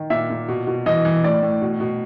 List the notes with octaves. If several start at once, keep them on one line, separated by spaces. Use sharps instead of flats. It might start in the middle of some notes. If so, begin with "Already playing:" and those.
Already playing: D#3
A#2 E5
A#2
B2
B2
E3 D#5
E3
A2 D5
A2
B2
B2